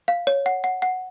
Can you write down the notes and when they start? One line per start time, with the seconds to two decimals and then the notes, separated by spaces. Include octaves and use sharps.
0.08 F5
0.27 C#5
0.46 F#5
0.64 F#5
0.82 F#5